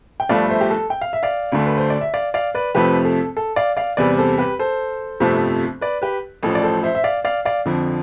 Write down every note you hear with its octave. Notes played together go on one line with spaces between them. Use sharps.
G5
G1 G2 F3 A3 D5 F5
C5 E5
G4
A4
G5
F5
E5
D5 F5
D2 D3 A3
B4
C5
D5
E5
D5 F5
D5 F5
B4 D5
F2 C3 F3 A3 G4 B4
A4
A4
D5 F5
D5 F5
E2 C3 G3 B4 D5
A4 C5
G4 B4
A4 C5
G1 F2 C3 F3 A3
B4 D5
G4 B4
A1 A2 F3 A4
D5
A4 C5
C5 E5
E5
D5 F5
D5 F5
D5 F5
F2 D3 F3